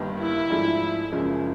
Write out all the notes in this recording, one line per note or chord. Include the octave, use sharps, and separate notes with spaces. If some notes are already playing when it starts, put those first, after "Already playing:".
Already playing: G1 G2 D#3 G3 A#3
E4
G#2 F3 A3 D4
F#1 F#2 C#3 F3 G#3